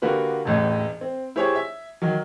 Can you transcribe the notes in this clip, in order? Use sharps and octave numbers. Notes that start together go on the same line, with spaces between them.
D3 A#3 F#4 G4 B4
E1 A1 A2
C4
E4 G4 G#4 C5 C#5
E5
D#3 F#3